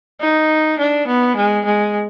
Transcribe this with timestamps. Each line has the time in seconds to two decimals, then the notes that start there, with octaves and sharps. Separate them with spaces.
0.21 D#4
0.79 D4
1.08 B3
1.36 G#3
1.65 G#3